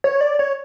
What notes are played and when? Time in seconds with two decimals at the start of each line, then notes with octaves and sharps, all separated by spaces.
0.04 C#5
0.21 D5
0.39 C#5